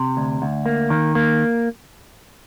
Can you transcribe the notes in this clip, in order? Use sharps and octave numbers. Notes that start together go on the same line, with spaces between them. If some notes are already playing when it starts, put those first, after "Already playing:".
Already playing: C3
D2
D2
A#3
D#3
A#3